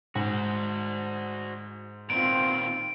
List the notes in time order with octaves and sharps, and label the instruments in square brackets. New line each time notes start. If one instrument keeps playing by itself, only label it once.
[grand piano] G#2 [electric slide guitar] F#4 C5
[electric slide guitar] A#2 D#3 B3 [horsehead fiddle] C4 F4 [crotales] D7